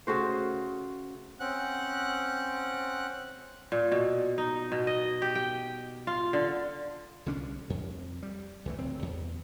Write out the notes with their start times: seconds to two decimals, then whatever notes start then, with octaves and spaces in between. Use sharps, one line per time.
0.07 C#3 A3 F#4 C5
1.40 C4 C#4 F#5 F#6
3.72 A#2
3.92 B2
4.38 D#4
4.72 B2
4.87 D#5
5.22 G4
5.35 G5
6.07 F4
6.33 D3
7.26 C2 D3 C#4 D4
7.70 F2
8.23 G3
8.65 C#2 E3 A3
8.78 D1 C4
9.02 E2